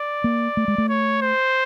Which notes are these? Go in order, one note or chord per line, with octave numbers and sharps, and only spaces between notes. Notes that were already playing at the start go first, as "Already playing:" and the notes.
Already playing: D5
A#3
A3
G#3
A3
C#5
C5